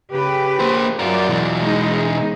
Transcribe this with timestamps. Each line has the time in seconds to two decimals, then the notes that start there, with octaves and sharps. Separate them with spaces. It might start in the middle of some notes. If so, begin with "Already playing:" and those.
0.11 C#3 G4 B4
0.60 A#3 C5
0.99 F#3 F4 F#4 A#4 D5
1.29 B2 E3
1.59 G#3 D#4